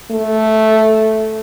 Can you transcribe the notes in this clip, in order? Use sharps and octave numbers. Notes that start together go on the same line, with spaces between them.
A3